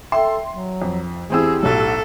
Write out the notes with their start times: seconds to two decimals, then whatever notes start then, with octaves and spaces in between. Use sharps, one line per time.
0.12 A4 E5 G5 C6
0.50 F#3
0.82 F2
1.30 E2 C4 E4 G4 G#4 E6
1.63 B1 A2 F#3 A4